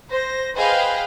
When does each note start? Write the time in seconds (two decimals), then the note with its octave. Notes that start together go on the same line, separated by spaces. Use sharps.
0.11 C5 A#6
0.57 G#4 B4 C5 D#5 F5 G5